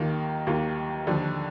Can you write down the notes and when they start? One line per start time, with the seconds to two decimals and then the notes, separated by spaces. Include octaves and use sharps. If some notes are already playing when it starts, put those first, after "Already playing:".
Already playing: D#2 D#3 A#3 F4
0.47 D#2 D#3 A#3 F4
1.07 D#2 D3 F3